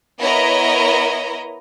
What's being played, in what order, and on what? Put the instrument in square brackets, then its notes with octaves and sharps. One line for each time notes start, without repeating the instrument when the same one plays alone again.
[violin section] B3 E4 A#4 C#5 D#5 A#5